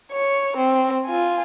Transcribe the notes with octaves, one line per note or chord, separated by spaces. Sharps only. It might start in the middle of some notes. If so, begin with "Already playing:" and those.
C#5
C4
F4 G#5